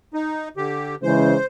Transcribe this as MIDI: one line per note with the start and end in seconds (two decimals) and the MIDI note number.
0.14 0.49 63
0.57 0.95 50
0.57 0.95 67
1.03 1.35 49
1.03 1.35 52
1.03 1.35 56
1.03 1.46 72